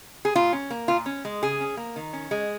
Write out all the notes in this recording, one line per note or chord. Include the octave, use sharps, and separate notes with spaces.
G#4
A#2 F4
C#4
A#3
A#2 F4
C#4
G#3
C#3 G#4
C#4
A#3
D#3
C#4
G#3